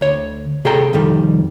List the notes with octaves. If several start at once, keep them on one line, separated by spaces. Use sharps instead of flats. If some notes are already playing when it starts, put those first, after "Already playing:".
D2 C#5
C3 G#4 A4 G5 A#5
C2 F2 D#3 G3 A4